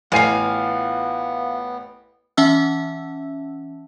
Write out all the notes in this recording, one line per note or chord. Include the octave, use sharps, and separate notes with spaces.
A1 B3 F4 F5 G#5 C7
E3 C#4 E5 F#5 A5 E6